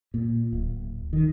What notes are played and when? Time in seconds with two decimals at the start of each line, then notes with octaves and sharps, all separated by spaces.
0.14 A#2
0.53 D1
1.13 D#3